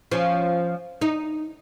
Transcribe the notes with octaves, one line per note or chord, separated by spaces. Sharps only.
F3 C#4
D#4